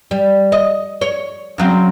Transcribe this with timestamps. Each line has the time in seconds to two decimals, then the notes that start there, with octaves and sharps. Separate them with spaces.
0.11 G3
0.52 D#5
1.01 C#5
1.58 C#3 F#3 C4